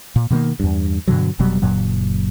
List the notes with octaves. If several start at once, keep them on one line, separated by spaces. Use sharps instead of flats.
A#2
B2 D#3 G#3 A#3
E2 G2
G2 B2 D3 F#3
F1 B2 F#3 G3
F#1 F#2 A#2 F#3